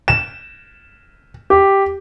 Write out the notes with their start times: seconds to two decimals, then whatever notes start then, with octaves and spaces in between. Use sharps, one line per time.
0.08 E7
1.50 G4